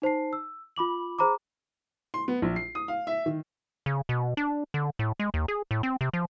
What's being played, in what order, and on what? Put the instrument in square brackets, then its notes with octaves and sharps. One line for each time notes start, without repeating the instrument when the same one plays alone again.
[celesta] D#4 C5 A5 C7
E6
F4 B5 D6 F#7
G#4 C5 A#5 B5 D6
[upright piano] C6
B3
A#1
C7
D#6
F5
E5
D#3
[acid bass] C#3
B2
D4
D3
A2
G#3
D#2
G#4
A2
C4
C3
F3